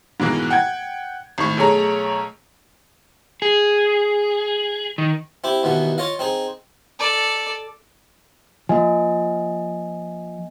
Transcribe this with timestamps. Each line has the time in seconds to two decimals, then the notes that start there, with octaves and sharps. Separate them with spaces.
0.20 G#2 B2 E3 A#3
0.50 F#5 G5 G#6
1.38 G#1 A2 C#6
1.57 B1 A3 G#4 C#5 A#5
3.42 G#4
4.98 D#3
5.44 C4 E4 G4
5.63 D#2 B2 E3 B3
5.98 F4 C#5 D#5 F5
6.19 C4 D#4 G#4
6.99 A4 D5
8.69 F3 A#3 D#5 G#5